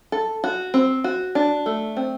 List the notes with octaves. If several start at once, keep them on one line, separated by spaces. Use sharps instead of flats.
A4
F#4
C4
F#4
D4
A3
C4